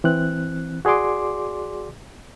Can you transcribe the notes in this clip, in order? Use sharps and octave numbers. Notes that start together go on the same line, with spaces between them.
E3 C4 F#6
F#4 G#4 D5 C6 D6